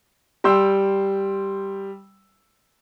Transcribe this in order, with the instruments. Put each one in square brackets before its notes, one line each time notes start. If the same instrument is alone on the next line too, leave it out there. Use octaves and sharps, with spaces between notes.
[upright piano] G3 G5 C6 E6